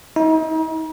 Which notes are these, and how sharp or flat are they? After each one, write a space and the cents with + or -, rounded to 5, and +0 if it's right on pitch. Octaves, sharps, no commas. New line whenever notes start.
D#4 +40